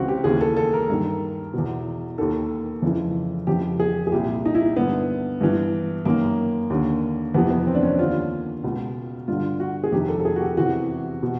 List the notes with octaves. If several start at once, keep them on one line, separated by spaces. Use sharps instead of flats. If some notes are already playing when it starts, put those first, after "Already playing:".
Already playing: C#2 C#3 E3 C4 F#4
G4
D#2 C#3 E3 G#4
A4
A4
A#4
G2 D#3
E2 B2
D#2 D#3 A4
F2 C#3 E3
F2 C#3 E3 G4
G#4
G#4
C2 A#2 G4
D#4
E4
G2 D3 B3
G2 E3
F#2 D#3 A#3
D#2 D3
F2 C3 E3 B3
B3
C4
D4
C#4
D#2 D3 F4
C#2 B2
G2 D3 F4
F#4
G#4
F2 C3 D#3 G4
A4
A4
G#4
F#4
G4
E2 C3 E3 F#4
B2